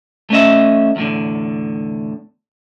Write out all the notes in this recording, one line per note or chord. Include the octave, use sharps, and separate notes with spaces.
A3 C#4 D#5 E5
E2 A2 D3